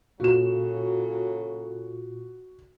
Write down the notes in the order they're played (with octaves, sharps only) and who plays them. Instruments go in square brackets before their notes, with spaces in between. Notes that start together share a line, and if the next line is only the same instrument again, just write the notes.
[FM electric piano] A#2 F4 [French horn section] C#3 F#3 A4 [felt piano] F#4 E7